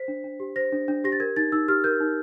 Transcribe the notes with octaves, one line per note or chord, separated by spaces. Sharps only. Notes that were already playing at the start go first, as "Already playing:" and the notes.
Already playing: C5 B6
D4
D4
G4
C5 A#6
D4
D4
G4 A#6
A6
A#4 G#6
D#4 A6
D#4 E6
G4 F6
A#4 G6
D#4